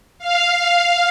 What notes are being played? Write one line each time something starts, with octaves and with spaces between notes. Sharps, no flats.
F5